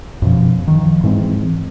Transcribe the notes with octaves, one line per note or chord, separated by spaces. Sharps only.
F#2 B2 F3
D#3 F3
G#2 E3 G#3 C4